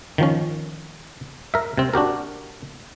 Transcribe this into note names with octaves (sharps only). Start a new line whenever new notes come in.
D#3 F3 C#4
A#4 E5
C3 C4
D4 F#4 G4 A#4